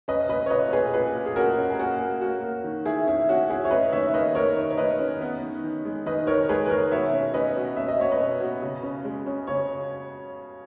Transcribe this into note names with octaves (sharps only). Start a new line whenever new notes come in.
C#4 B4 D#5
C#4 B4 D#5
C#5
A#2 B4 D#5
C#4 G#4 B4
A#2 G#4 B4
A#2
G#4
C#4 F#4 A#4
C#4
G#4
A#3 F#4
A#3
A#3 F#4
A#3
D#3
D#3 E4 G#4
C#4 E4
C#4 F#4
C#4 E4 G#4
C#5
C#4 B4 D#5
D#3 C#5 E5
A#3 B4 D#5
D#3 A#4 C#5
D#3
C#5
D#3 B4 D#5
C#4
B3
D#3
D#3
G#3
D#3 B4 D#5
D#3 A#4 C#5
G#3 G#4 B4
B4
D#3 A#4 C#5
B2 C#5 E5
C#4
C#4 B4 D#5
B2
C#4 E5
D#5
B2 C#5
B4 D#5
C#4
B2
C#3
C#4
G#3
C#4
C#3 C#5